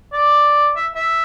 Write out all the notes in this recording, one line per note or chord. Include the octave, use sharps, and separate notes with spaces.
D5
E5
E5